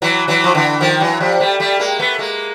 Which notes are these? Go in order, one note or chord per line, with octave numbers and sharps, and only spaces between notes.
E3 F#3
E3 F#3
F3
D3 E3
D#3 F3
E3 F#3
F3 G3
G3 A3
G3 A3
G#3 A#3
A3 B3
G#3 A#3